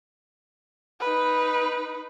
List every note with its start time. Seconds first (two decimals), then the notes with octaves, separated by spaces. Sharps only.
1.00 D#4 B4